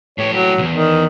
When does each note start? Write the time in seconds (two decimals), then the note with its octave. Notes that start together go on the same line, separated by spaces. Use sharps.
0.18 A2 G4 C#5
0.33 F#3
0.58 B1 E2
0.72 D#3